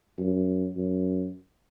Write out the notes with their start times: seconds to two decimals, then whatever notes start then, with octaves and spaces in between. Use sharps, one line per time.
0.19 F#2
0.77 F#2